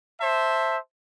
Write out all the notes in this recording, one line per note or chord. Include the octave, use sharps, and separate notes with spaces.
C5 E5 A5